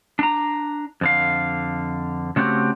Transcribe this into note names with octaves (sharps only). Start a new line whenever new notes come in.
D4 A#5
F2 D3 F5
C#3 A3 C4 F#4 G4